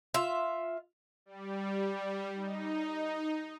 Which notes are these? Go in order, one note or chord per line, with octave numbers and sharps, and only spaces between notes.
F4 E5
G3
D#4